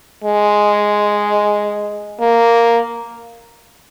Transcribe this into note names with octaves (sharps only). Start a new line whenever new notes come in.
G#3
A#3